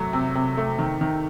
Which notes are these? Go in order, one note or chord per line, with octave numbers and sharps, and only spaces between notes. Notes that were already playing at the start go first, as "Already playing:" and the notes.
Already playing: C3 F#3 A3
C3
C3
A3
D#3
D#3